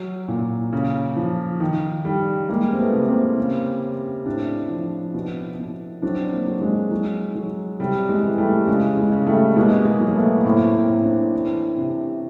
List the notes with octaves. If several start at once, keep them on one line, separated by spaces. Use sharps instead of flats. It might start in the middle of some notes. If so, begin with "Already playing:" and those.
Already playing: F#3
A#2
C#3
F3
D#3
G3
G3 G#3 A#3
C4
A3 B3
C3
A#3 C4
C#3
C#3
A2 C4 D4
F3
B2
B2
F#3 C4 D4
A#3 C4
F#3
G#3
F#3
F#3
C3 G3
G#3
E3
G3 A3
C#3 G#3
G#3
C#3
G3 A3
B2 G#3 A#3
G#3 A#3
F#3
A#3
A3 B3
A2 A#3 C4
A#3 C4
A2
C4 D4
E3
C3